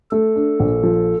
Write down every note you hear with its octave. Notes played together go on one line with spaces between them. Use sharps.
A3 A4
D4
A#1
F3